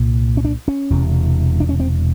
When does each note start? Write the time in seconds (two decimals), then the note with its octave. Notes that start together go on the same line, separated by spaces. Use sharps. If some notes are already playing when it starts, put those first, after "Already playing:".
Already playing: C2 A#2
0.37 C#4
0.45 D4
0.68 C#4
0.90 E1 E2 C3
1.60 D4
1.69 C#4
1.80 C4